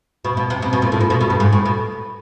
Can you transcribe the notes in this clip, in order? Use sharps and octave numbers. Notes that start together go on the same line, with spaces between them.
B2
B2
C3
B2
B2
A#2
A2
A#2
B2
B2
G2
G#2
A2
B2